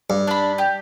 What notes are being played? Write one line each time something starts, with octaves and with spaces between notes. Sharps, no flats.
G2
D4 B5
G4